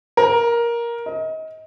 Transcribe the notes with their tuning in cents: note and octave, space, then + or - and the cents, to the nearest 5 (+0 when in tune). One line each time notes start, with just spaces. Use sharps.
A#4 +10
D#5 +30